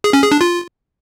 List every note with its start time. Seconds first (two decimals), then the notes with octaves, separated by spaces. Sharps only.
0.04 G#4
0.13 C#4
0.22 G#4
0.32 D4
0.41 F4